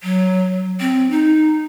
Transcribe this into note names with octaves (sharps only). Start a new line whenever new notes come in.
F#3
C4
D#4